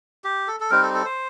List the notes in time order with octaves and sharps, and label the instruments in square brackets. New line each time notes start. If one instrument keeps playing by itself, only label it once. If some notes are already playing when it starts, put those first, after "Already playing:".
[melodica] G4
A4
A4
G3 C4 D#4 A#4
A4
A4
C5